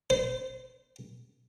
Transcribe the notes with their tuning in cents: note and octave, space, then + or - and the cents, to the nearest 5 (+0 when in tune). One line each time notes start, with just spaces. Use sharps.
C5 -35